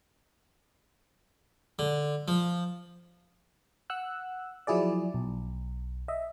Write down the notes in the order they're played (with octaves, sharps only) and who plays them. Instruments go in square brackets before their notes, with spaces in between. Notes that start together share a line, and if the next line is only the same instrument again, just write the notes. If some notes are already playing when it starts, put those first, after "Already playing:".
[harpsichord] D3
F3
[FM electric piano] F#5 E6 F#6
F3 F#3 E4 G#4 D5
B1
D#5 E5